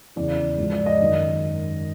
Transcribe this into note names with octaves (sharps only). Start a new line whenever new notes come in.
E2 C#3 E3 D5
G#2 F3
D5
D#5
F#2 D#3 F#3